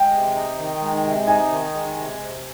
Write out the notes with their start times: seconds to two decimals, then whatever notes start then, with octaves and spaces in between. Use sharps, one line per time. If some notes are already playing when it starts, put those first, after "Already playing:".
Already playing: G#3 G5
0.11 C3
0.35 D#4
0.58 D#3
0.81 G#3
1.04 C3
1.27 D#4 G#5
1.50 D#3
1.74 G#3
1.96 C3
2.20 C3